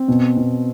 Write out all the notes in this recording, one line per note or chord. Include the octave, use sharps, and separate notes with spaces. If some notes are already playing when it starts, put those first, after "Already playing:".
Already playing: C4
B2
B2